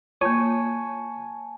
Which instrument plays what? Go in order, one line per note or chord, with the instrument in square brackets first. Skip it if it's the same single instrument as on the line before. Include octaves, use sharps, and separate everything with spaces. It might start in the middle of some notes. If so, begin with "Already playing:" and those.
[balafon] A#3 F4 [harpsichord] C#5 [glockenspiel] G#5 A5